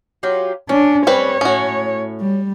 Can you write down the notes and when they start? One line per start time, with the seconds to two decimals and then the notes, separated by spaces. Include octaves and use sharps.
0.23 F#3 F4 G4
0.69 C#4 D4
1.07 G3 C4 B4 C#5
1.41 A2 C#4 F#4
2.21 G3